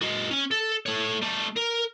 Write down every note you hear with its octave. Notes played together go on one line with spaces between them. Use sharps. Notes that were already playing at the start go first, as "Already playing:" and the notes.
G#3 F#4
C#4 G#5
A4
A3 C#5
G3 A3
A#4